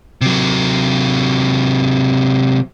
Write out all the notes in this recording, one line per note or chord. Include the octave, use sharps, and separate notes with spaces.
C3 F#3